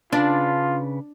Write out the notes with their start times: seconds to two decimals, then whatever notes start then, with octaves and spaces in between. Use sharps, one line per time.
0.13 C#3 D4 F4 B4 C6